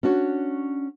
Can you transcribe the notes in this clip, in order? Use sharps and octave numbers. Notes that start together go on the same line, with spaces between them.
C#4 D4 F#4 C#5